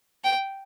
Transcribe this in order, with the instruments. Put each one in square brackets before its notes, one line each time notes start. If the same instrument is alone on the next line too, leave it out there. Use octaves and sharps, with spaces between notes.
[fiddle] G5